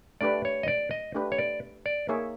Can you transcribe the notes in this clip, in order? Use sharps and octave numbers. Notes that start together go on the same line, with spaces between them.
A3 D4 G4 B4 D5
C#5
D#5
D5
D#5
A3 D4 G4 B4
C#5
D5
D5
A#3 D#4 G#4 C#5 E5